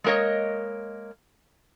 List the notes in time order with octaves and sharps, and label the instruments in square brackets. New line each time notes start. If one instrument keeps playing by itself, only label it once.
[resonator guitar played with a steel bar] G#3 A#3 A#4 C#5 D#5